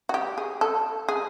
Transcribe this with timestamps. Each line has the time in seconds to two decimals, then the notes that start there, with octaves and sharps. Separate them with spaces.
0.09 F#4
0.14 G4
0.38 G#4
0.61 A4
1.08 G#4